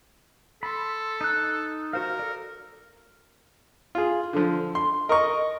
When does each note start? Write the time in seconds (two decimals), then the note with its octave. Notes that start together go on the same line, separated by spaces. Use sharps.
0.63 A4 B5 C6
1.21 D#4 F#6
1.93 F#4 A#4 C5 F5
2.19 A4 D5
3.95 F4 G#4
4.33 D3 F3
4.75 C6
5.09 A#4 D#5 C#6